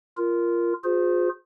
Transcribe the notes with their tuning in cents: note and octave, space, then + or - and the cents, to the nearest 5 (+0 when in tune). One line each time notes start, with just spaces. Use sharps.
F4 -15 A#4 +0
F4 +35 G#4 +0 C5 -25